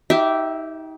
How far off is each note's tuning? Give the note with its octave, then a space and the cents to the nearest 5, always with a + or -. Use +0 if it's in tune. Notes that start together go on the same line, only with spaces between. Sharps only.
D#4 +35 G4 -15 E5 +0